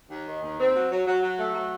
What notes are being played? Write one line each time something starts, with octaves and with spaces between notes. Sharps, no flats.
D#2
D#3
D#2
C4
F#3
F#3
F#3
F#3
A3
F#3